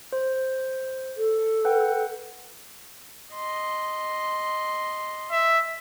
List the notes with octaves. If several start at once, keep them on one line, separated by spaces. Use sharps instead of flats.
C5
A4
B4 F#5 G5
D#5 C6
E5